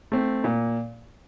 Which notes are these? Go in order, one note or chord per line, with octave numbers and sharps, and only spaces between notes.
A3 C4
A#2